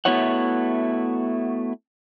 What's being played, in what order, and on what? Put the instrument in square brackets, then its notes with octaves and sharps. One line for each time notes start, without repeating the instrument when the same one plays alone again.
[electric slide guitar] A3 B3 E4 F#4 C#5 F#5